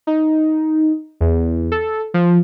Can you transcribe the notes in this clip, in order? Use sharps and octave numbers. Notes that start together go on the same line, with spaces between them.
D#4
E2
A4
F3